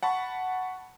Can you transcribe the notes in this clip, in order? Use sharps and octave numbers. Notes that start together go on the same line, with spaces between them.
F#5 A5 B5 C#6